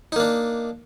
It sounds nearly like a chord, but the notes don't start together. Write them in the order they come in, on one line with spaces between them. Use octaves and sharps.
D#4 A#3 D4